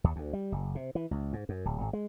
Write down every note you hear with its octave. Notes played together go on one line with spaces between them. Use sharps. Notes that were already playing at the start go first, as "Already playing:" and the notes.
D#2
D2
G3
F#1
C3
E3
C#2
G#2
F#2
D1
G#1
G#3